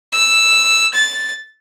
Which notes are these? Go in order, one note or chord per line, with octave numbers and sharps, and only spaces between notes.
E6
A6